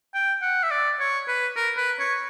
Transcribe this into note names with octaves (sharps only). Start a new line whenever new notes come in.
G5
F#5
E5
D5
C#5
B4
A#4
B4
C#5